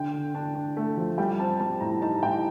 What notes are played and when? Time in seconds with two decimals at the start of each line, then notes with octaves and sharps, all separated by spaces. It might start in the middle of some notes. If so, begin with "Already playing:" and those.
Already playing: D3 G5
0.13 D3
0.35 D4
0.55 D4
0.77 A3
0.97 F3
1.18 G3 G5
1.39 C4 A5
1.60 G3 A5
1.80 A2 A#5
2.02 D#4 A5
2.23 A2 G5